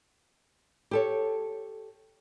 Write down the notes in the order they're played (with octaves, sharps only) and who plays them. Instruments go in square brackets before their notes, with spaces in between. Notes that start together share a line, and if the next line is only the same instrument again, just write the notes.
[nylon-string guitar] G4 A4 C#5